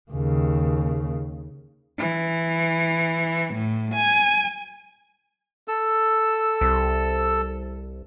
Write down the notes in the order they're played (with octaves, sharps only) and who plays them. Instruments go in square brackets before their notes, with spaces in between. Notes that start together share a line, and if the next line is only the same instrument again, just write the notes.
[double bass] D#2 C#3
[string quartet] E3
A2
G#5
[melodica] A4 E6
[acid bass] C2